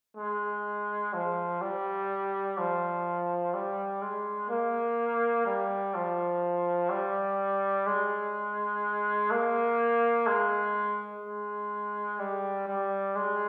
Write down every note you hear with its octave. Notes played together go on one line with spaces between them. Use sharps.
G#3
F3
G3
F3
G3
G#3
A#3
G3
F3
G3
G#3
A#3
G#3
G#3
G3
G3
G#3